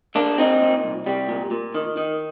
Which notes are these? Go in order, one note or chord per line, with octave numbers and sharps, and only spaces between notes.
D3 A#3 D4
A#2 C4 D#4
A#2
C2
C2 G3
A#2
A#2
D#3
D#3